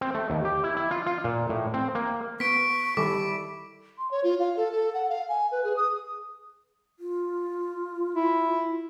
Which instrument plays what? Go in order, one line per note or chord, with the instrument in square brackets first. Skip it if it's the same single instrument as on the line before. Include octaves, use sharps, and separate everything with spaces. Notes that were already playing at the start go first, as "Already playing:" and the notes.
[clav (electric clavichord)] C4
A3
D#2
G4
E4
E4
F4
F4
A#2
A2
C4
A#3
[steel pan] B3 [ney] C#6 [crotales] B6 D7
[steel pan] D#3 G3 A4 [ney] E4 [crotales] D6
[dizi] C6
C#5
F4
F5
A4
A4
F#5
F5
G#5
B4
G#4
D#6
[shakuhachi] F4
[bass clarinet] E4